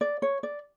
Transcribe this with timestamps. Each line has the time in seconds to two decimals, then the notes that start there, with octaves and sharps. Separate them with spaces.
0.01 D5
0.22 C#5
0.43 D5